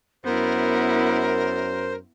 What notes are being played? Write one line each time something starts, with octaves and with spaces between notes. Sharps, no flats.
F#2 B3 E4 A#4 C5